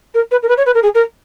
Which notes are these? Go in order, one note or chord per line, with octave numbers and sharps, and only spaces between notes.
A#4
B4
A#4
B4
C#5
B4
A#4
G#4
A#4